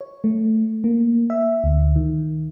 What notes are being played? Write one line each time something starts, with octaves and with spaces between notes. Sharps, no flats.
C#5
A3
A#3
E5
D2
D#3